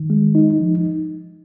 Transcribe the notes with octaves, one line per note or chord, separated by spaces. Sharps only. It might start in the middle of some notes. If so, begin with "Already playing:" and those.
Already playing: D#3
G#3
D#4
F3